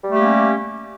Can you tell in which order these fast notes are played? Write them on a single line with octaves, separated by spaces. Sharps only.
G3 A3 G4 A#3 C#4